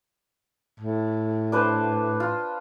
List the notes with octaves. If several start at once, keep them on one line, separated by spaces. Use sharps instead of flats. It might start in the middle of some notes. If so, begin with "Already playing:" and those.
A2
D4 B4 C5
F4